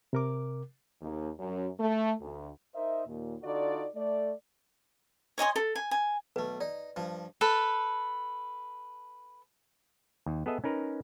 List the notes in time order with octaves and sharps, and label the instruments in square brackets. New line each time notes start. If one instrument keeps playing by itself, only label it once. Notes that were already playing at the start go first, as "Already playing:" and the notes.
[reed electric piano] C3 A#4 D6
[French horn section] D#2
F#2
A3
D2
[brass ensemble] D#4 A#4 C5 D#5 E5
D#2 A#2
D3 D#4 F4 F#4 A4 D5
A3 D5
[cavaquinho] C#5 D#5 G#5 C6
A4
G#5
G#5
[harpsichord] B1 A3 [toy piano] B4
[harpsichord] D#4 [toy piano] D5
[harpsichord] G2 F3
[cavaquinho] A4 B4
[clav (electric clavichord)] D#2
B3 G#4 A4 D#5 E5
C#4 D#4 A#4 B4